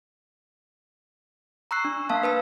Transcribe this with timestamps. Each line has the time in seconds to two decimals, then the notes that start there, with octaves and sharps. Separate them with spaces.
1.71 A#5 C#6 E6 F#6 C7
1.85 D4
2.09 A#3 F5 A5
2.23 B4 A5 E6